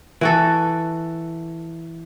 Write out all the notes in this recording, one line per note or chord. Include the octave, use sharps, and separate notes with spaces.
E3 F#4 A4